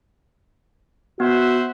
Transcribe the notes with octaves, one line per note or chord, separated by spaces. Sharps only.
B3 F#4 C5 E5 F#5